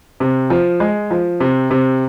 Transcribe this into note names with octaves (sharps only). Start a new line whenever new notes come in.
C3
F3
G#3
F3
C3
C3